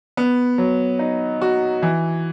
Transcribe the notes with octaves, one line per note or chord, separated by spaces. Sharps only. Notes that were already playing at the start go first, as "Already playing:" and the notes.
B3
F#3
D#4
F#4
E3